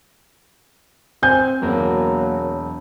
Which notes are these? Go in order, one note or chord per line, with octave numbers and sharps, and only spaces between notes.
C4 G#5 G6
E1 F#3 A#3 F#4 A#4